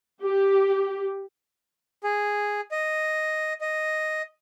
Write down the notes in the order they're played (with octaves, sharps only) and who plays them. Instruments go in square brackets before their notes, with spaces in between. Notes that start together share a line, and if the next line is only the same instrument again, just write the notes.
[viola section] G4
[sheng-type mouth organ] G#4
D#5
D#5